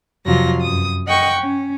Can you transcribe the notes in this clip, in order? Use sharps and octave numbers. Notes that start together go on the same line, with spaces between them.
F2 C3 F#3 F4 A#6
F#2 D#6
D#5 F#5 G5 C#6
C#4